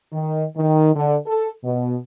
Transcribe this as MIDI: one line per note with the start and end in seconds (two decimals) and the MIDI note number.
0.13 0.44 51
0.57 0.92 51
0.96 1.16 50
1.27 1.50 69
1.64 1.97 47